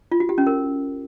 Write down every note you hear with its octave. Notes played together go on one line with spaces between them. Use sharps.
F4
F#4
G4
C#4
A#4